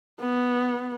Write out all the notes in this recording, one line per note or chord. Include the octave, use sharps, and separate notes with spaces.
B3